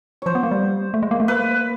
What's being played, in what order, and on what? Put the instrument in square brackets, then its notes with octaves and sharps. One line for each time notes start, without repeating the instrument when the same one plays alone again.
[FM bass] F3 [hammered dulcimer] C5 C#5
[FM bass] B3
A#3
G3
A3
G#3
A#3
A3
[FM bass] A#3 [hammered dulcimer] B4